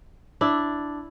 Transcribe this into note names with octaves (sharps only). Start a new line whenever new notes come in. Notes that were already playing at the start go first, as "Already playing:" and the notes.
D4 E4